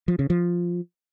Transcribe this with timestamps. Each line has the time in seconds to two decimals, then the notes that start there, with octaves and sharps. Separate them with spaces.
0.08 F3
0.19 C#3
0.30 F3